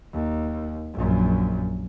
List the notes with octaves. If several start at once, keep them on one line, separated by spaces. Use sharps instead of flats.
D#2
A#1 F#2